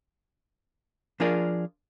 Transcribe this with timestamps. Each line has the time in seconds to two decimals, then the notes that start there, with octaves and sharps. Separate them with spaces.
1.20 F3 D4 F4 G#4 A#4 D5